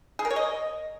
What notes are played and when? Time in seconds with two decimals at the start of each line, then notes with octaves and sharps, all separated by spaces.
0.19 G#4
0.25 A#4
0.30 C#5
0.36 D#5